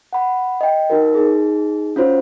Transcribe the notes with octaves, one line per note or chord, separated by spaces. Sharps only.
F#5 B5
D#5 G5
D#4 F#4 A#4
D#4 G#4
C#4 F4 F#4 C5 C#5